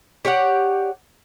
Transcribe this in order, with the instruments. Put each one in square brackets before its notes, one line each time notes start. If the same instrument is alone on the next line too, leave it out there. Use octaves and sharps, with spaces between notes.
[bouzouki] G4 C#5 D5 F#5